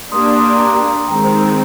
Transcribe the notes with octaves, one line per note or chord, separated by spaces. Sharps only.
A#3 D4 G4 C6 D#6
C6 D#6
C6
A#5 D6
D#3 G#3 C4 G5 A#5
C5
C5